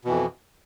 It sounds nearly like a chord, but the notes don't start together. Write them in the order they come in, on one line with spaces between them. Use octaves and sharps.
B2 E3 F2